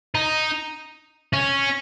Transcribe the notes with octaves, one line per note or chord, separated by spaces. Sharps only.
D#4
C#4